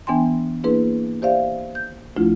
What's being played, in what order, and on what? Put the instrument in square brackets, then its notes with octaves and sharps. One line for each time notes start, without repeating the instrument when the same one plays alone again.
[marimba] E3 B3 D4 G5 G#5 C6
A#3 D4 E4 G#4 B4 C6
G4 C5 D5 E5 F5
G6
D2 F3 A3 D4 E4 F4